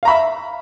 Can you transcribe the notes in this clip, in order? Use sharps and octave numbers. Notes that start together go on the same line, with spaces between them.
E5 F5 A#5 B5